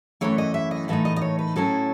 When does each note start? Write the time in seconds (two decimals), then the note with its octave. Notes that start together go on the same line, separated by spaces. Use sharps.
0.21 F#2 E3 A3 E4 C#5
0.38 D#5
0.54 E5
0.71 D#5
0.88 A2 E3 A3 D#4 E5
1.05 D#5
1.16 D#5
1.21 C#5
1.39 B4
1.56 A2 F#3 C#4 E4 A4